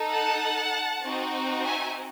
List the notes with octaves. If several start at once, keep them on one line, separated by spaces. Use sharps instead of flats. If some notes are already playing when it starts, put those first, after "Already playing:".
Already playing: D#4 A4
F#5 A5
C4 D#4 F#4
E5 G#5